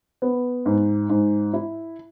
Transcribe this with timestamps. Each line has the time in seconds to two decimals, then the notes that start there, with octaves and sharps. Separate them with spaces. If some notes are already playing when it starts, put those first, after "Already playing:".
0.22 B3
0.66 G#2
1.10 G#2
1.53 E4